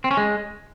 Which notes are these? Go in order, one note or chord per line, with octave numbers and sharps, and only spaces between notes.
C4
C#4
G#3